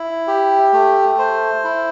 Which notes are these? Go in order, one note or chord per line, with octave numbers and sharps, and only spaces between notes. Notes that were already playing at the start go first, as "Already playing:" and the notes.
Already playing: E4
G4
A3
C5
E4